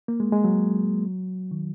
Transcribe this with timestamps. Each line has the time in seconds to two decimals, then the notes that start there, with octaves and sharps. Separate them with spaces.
0.08 A#3
0.20 G#3
0.32 G#3
0.44 F#3
1.51 D#3